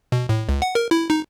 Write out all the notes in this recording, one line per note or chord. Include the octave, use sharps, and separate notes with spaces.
B2
A2
C#2
F#5
A#4
E4
D#4